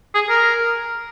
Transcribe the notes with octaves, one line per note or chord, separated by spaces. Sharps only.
G#4
A#4